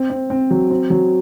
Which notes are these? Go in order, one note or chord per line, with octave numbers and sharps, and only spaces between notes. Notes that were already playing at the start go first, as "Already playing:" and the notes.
Already playing: C4
C4
C4
F#3
C4
F#3